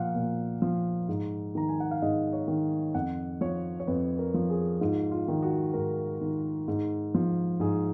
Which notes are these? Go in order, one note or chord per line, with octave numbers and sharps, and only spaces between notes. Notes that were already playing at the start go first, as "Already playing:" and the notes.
Already playing: A#2 F3 F5 F#5
A#2
F3
G#2
D#3 A#5
G#5
F#5
F5
G#2 D#5
C#5
D#3
F2 F#5
F3 C#5
C#5
F2 B4
A#4
F3
G#4
G#2 F4
F4
D#3
F#4
G#2 A#4
D#3
G#2
F3
G#2 G#4